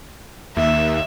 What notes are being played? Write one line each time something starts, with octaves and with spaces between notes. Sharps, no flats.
D#2 E5